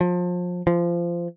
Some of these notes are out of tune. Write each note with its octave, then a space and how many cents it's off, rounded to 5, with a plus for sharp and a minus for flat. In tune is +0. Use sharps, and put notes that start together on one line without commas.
F3 +30
F3 -20